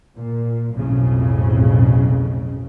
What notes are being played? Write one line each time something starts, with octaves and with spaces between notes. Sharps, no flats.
A#2
B1 F2 A2 C#3